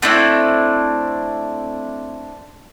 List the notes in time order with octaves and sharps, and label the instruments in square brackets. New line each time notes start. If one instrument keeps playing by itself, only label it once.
[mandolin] A3 C4 D4 E4